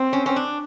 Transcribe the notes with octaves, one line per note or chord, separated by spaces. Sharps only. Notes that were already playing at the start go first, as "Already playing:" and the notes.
Already playing: C4
C#4
C#4
D4